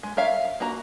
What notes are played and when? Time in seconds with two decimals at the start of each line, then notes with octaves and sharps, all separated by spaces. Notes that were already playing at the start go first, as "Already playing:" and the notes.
0.03 G#3
0.17 A#4 C#5 E5 F5
0.45 F5
0.60 A#3 F#4 A#5